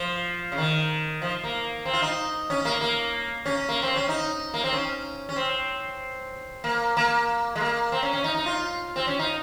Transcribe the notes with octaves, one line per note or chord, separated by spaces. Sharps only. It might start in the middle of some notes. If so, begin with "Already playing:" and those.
Already playing: F3
C#3
D#3
F3
A#3
C4
F4
D#4
C#4
A#3
A#3
C#4
A#3
C4
C#4
D#4
A#3
C4
C#4
C#4
C4
A#3
A#3
G#3
A#3
C4
C#4
C#4
D#4
D#4
F4
C4
C#4
D#4